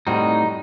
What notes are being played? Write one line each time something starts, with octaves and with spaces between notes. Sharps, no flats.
A2 G3 C4 D#4 F#4